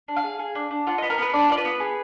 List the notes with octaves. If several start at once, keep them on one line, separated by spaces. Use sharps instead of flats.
D4
F5
G#4
G#4
D4
D4
F4 F#5
B3 D#5
A#4
B3 B4
D4 D5
F4 D5
B4
B3
G#4